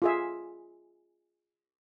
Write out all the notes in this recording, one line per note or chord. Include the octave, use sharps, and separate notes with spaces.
F4 G#4 E5